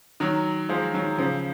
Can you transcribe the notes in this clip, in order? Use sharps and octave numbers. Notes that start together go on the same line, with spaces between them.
D#3 F#3
F3 G#3
D#3 F#3
C#3 F3